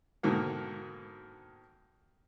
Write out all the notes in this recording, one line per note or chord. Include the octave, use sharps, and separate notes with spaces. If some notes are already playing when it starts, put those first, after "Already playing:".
G#2 B2 D3 D#3 A#3